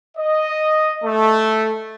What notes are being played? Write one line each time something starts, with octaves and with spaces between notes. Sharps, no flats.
D#5
A3